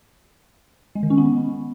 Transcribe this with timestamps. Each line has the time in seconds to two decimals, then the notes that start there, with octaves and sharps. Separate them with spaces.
0.95 G#3
1.03 D#3
1.10 C#4
1.18 B3